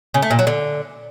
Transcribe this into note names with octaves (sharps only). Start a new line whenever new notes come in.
C#3
A3
A#2
F#3
D3